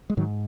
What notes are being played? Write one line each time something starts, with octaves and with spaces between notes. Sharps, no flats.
G#3
G#2 D#3 F#3